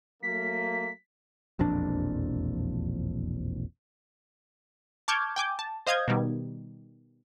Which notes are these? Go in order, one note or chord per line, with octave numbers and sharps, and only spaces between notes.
F#3 A3 A#3 B6
E1 A#1 F2 D4
A5 C#6 D6 F6 G6 G#6
G5 G#5 D6 G6
A5
C5 D#5 F5 D#6 G6 G#6
B2 D#3 G3